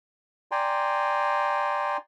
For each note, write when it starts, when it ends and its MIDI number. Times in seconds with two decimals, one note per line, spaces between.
0.51 1.97 74
0.51 1.97 79
0.51 1.97 80
0.51 1.97 82
0.51 1.97 84